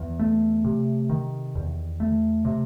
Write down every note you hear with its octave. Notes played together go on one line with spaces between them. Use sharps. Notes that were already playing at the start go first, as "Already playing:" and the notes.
Already playing: E2
A3
C3
D#3
E2
A3
C3